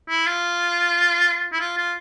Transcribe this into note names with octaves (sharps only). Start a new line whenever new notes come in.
E4
F4
E4
F4
F4